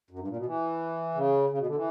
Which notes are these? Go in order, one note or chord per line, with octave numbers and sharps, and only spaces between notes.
F#2
G2
A#2
B2
E3
C#3
C#3
B2
D3
E3